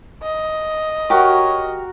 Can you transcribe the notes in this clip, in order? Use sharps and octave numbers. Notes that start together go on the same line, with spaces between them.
D#5
F#4 G4 A#4 C#5